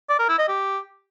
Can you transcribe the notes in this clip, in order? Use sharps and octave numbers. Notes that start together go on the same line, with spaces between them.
D5
A#4
E4
D#5
G4